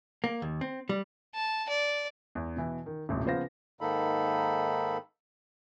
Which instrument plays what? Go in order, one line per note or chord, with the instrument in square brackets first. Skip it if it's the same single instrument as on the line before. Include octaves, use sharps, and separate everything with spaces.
[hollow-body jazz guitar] A#3
D#2
C4
G3
[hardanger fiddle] A5
D5
[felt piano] E2
B2 E3
D#3
D#1 A1 C3
C#3 F3 B3 C5 F5 A#6
[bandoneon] G#2 D#3 A#3 D#4 A4 B5